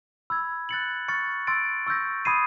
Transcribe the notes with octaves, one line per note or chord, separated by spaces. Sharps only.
B5 E6 G#6
F#6 A6 C#7 F#7
C#6 F6 A6 C#7
C6 E6 A6 D7
C#6 E6 G6 A#6
B5 D#6 G#6 C7 D#7